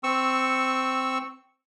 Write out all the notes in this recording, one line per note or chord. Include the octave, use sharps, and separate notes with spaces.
C4 C#6 E6